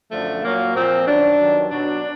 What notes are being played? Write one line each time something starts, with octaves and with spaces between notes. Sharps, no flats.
F#2 D3 F3 A3
A#2 F#3 A#3
A#2 F3 C4
F#2 D#3 F#3 D4
G2 D#3 F#3
B2 F#3 D4